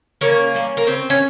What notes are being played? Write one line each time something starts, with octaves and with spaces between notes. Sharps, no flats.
C#3 A#3 C#4
G3 A#3
A#3
C#3 C4
C#4